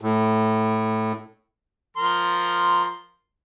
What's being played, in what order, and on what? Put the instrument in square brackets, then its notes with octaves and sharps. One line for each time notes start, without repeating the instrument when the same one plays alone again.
[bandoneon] A2
[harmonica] F3 A#4 C6